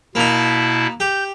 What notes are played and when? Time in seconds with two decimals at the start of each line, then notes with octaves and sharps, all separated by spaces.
0.15 B2 A#3 D#4 E4 A5
1.00 G4 G6